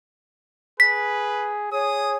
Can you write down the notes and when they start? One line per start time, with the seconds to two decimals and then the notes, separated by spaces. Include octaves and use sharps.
0.80 G#4 B4 B6
1.73 G#4 C#5 D#6